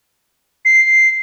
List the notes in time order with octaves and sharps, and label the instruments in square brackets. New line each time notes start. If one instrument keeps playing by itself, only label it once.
[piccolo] C7